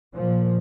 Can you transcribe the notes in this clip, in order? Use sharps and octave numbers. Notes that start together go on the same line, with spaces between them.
A#2 F3